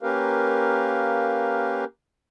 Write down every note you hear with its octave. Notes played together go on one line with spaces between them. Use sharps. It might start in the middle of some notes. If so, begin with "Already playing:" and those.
A#3 C#4 G4 A#4 B4 F5